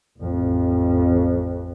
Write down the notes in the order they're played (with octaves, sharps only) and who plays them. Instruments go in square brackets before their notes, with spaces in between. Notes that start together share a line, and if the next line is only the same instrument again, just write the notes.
[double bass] A1 F2